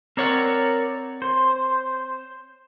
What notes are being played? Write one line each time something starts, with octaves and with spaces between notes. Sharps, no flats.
C4 A#4 C#5 D5 F#5
C5